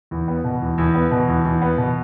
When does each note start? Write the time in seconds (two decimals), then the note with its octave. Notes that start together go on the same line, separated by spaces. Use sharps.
0.11 E2
0.28 B3
0.44 B2
0.62 E2
0.78 E2
0.94 B3
1.11 B2
1.28 E2
1.45 E2
1.62 B3
1.78 B2